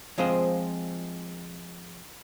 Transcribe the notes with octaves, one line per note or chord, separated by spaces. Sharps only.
F3 G#3 C4 F4 G#4 C5